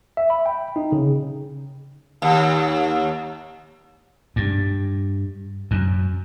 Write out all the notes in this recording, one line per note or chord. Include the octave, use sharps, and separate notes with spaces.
E5
B5
G5
D#4
C#3
D#2
G2
F#2